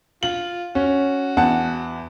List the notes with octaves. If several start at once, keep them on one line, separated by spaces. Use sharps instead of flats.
F4 F#7
C#4 F#4
E2 F#5 A5